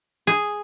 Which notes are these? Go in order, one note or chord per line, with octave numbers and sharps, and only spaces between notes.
G#4